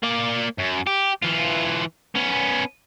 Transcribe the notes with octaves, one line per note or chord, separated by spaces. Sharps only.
A#3 D5
F#2
G4
E3 F4
B3 C#4